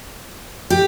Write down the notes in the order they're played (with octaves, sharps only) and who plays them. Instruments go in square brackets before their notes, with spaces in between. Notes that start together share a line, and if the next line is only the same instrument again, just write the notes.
[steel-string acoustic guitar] G4